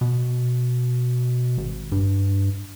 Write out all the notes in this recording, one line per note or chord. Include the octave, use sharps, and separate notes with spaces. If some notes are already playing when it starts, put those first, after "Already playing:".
B2
G#1
G2